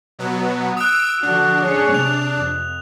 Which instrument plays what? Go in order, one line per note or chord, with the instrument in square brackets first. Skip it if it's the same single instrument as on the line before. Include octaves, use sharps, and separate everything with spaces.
[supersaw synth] B2 F#3 B3
[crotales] D#6 F#6 [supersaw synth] E6 D7
[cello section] D3 F3 F#4 [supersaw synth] D4
[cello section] C#4 G#4 C#5
[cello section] C3 [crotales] F7
[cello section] F2